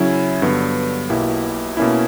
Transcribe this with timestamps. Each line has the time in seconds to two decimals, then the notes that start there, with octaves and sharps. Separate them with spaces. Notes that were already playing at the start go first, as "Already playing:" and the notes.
Already playing: C#3 F#3 C#4 E4
0.42 G2 D3 F#3 B3
1.10 B1 B2 A#3 E4 G4
1.77 B2 A#3 C#4 E4